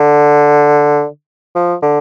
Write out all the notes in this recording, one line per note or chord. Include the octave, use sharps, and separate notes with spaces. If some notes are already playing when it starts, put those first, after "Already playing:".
Already playing: D3
F3
D3